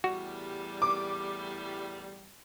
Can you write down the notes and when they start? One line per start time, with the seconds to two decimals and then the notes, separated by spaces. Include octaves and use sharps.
0.04 E2 A2 G3 F#4
0.82 D6